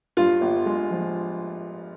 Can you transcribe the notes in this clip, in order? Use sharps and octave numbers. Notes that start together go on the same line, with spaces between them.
G2 F4
G1
G#3
F3